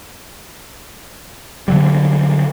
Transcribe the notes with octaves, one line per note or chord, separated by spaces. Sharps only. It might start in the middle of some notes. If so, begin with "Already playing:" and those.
D3 F#3 G3